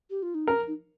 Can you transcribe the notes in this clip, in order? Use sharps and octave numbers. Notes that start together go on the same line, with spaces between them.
G4
F4
D#4
C#4 A#4
D#4